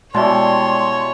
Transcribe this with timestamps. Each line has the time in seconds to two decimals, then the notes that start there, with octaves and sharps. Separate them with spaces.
0.14 B2 E3 G3 G#3 C#5 D5 A5 C6